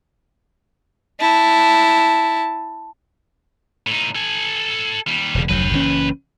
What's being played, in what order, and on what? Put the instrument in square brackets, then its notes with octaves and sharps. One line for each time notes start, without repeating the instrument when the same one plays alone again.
[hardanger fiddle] E4 A5
[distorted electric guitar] A2 D#4
A4 G#5
D#2 G3
[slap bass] E1 C#3
[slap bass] F1 D2 F#3 [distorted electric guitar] B4 G5
[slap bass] F#1 E3 C#4